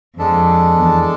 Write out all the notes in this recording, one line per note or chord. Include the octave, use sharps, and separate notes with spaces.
F2 G#3 D4 A4
E2